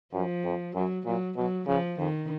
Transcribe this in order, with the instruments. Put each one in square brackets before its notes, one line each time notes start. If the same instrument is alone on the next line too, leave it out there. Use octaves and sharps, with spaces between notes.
[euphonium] F#2 [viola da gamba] F3
[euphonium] F2
[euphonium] F#2 [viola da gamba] F#3
[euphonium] A#2 [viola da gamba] F#3
[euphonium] B2 [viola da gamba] F#3
[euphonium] C#3 [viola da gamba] F3
[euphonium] F2 [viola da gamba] D#3